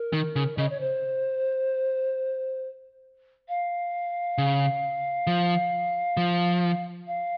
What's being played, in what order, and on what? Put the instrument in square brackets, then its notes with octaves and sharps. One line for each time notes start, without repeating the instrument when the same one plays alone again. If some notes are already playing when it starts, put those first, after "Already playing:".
Already playing: [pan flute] A#4
[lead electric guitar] D#3
C#3
[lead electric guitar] C#3 [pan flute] D#5
[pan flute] C#5
C5
F5
[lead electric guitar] C#3
F3
F3
[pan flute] F5